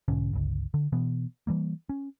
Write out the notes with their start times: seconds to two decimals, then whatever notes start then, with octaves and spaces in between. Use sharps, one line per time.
0.08 B1 G#2 D3 C#4
0.33 G1 C#2
0.74 D3
0.92 B2 E3 B3
1.47 E3 G3 A#3
1.89 C#4